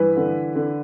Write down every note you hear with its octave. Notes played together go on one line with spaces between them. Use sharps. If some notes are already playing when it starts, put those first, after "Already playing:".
Already playing: G2 E3 B4
D3
D3